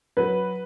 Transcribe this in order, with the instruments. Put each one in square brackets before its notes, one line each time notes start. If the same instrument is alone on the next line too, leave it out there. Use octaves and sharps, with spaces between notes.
[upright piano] F#3 [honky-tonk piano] B4